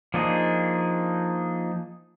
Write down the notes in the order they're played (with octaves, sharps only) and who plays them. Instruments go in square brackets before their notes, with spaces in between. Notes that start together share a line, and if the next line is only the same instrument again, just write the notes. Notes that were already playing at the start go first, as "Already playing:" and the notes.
[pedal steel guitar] F3 A#3 D4 D#4 G#4